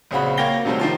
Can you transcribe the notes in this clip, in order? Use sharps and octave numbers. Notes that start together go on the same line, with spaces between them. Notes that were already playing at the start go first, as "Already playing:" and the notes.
A#1 C#3 C4 F#4 B5
A#3 C#5 G5 A#6 G7
C3 D#3 F#3 G3 A3 C4
D#3 F3 F4